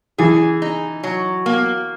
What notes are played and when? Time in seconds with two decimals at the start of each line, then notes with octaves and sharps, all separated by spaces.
0.18 E3 G#4
0.62 D#4
1.03 F#3
1.46 A#3